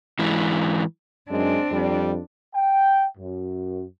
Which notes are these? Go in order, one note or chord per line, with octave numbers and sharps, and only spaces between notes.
G#2 E3
F#2 G#3 C4 D4
F2 G3
G5
F#2